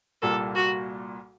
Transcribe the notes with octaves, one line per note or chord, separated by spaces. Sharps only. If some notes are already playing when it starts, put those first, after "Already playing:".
C2 A#2 G3 A#3 A4
F#4